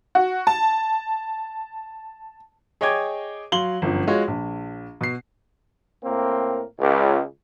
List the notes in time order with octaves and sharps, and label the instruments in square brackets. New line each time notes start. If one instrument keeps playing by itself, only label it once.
[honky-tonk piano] F#4
A5
[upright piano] G#4 C#5 D#5 G5 D6 G#6
F#3 F5 C6 F#7 G7
G1 F#2 F3
G#3 F4 F#4 C#5
A#1
B2 C7
[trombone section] A2 A#3 C4 A#4
C#2